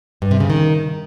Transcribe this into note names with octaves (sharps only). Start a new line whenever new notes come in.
G2
C3
C#3
D#3